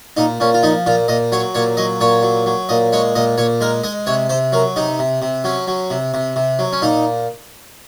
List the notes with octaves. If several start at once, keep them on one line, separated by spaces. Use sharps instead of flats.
A#2 D#4
A#2 C#4
F4
F3 D#4
A#2 F4
A#2 D#5
F#3 C#5
A#2 C#5
F#3 D#5
A#2 C#5
F#3
F#3
A#2 D#5
G#3 C#5
A#2 D#5
A#2 C#5
G#3 A#4
G#3 D#5
C3 C#5
C3 C5
F#3 A#4
C3 D#4
C3
C3
F#3 C#4
F#3
C3
C3
C3
F#3
C#4
A#2 D#4